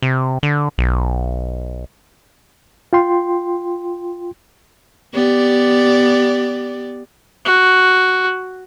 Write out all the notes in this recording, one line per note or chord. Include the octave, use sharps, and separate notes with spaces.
C3
D3
B1
F4 G5 C6
B3 G4 D5
F#4